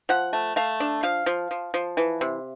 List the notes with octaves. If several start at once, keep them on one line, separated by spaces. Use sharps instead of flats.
F3 F#5
A3
A3 F5
D4
F3 F5
F3
F3
F3
E3
C3